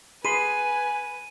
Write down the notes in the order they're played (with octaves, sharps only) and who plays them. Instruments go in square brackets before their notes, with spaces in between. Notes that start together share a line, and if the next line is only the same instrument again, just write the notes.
[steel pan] G#4 B5 C6 [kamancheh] B4 [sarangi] G#5 [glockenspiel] D#7